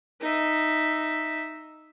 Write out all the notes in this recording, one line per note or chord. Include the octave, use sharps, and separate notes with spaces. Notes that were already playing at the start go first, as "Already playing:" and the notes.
D#4 E5